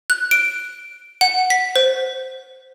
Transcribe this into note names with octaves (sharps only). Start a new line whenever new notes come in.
F#6
D7
F#5
B6
C5